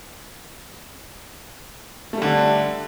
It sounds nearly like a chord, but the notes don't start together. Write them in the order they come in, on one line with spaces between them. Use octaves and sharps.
A3 G3 D3 D4